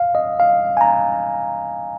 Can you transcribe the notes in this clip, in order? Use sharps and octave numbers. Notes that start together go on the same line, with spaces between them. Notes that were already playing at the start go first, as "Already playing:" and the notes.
Already playing: F5
D#5
F5
G#5
A#5